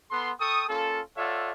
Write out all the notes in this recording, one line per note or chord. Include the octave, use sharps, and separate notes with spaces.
B3 A4 F#5 B5 C6
A4 G5 C#6 D#6
A#3 C#4 F4 A4
F4 A4 C#5 D5 E5 F#5